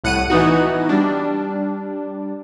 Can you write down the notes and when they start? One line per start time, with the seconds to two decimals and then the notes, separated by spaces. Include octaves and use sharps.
0.04 C2 A2 F#5 F#6 C#7 D#7
0.30 E3 B3 D#4 F#4
0.89 G3 D4